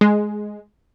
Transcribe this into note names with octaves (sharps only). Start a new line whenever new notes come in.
G#3